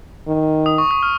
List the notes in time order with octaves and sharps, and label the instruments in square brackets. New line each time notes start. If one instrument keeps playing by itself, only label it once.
[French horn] D#3
[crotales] D#6
C#6
D#6
F6